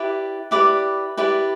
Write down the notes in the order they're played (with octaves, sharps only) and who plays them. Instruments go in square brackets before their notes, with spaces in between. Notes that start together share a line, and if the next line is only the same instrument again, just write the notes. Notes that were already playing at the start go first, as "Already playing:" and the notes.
Already playing: [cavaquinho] E4 G4 B4 D5
E4 G4 B4 D5 D6
E4 G4 B4 D5